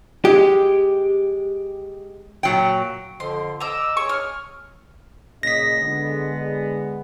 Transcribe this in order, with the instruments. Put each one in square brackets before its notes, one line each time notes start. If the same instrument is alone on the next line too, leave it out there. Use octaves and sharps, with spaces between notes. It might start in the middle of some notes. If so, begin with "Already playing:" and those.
[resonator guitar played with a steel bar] G#3 [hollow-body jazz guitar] G4
[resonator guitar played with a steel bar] A#2 F#3 G5
[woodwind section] F2 D3 F3 [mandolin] C6
[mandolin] D#5 A#5 [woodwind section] D6 E6
[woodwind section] G#4 C#5 [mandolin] C#6
[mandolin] F6
[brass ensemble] A#2 C#3 D#5 [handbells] A#6 B6
[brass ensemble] D3 G#3 B3